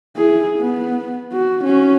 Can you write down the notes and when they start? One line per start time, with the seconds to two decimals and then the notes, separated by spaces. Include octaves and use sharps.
0.17 E4 G#4
0.58 B3
1.33 F#4
1.64 C#4 F#4